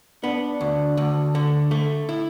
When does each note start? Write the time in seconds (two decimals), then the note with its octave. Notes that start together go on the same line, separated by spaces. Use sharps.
0.24 B3 D4
0.61 D2
0.97 D2
1.35 D3
1.71 A3
2.09 E4